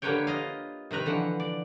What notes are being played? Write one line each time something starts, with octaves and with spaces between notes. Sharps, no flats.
D3 A#3 G4 B4 C#5 G5
F4 D#5 F5
C3 D#3 B4 A#5
D3 E3 F3 F#5
D5